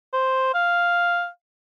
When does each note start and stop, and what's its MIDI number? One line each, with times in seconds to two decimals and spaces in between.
0.13 0.54 72
0.54 1.27 77